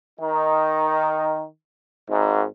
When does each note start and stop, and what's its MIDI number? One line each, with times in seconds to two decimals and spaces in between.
0.20 1.45 51
0.20 1.45 63
2.09 2.43 32
2.09 2.43 44